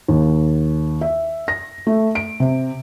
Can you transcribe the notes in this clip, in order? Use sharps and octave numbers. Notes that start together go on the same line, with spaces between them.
D#2
E5
A#6
A3
D7
C3